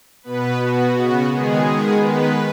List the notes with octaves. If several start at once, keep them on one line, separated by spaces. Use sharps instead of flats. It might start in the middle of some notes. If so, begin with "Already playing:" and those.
B2 B3 B4
B2 B3 F#4
C#3 B3
D#3 G#3 B3 G#4
D#3 G#3 B3
D#3 G#3 B3 B4